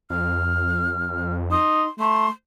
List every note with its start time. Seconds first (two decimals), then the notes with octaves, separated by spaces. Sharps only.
0.10 F2 F6
1.51 D#4 C6
1.99 A3 C6